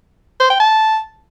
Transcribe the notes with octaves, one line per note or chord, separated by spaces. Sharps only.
C5
G5
A5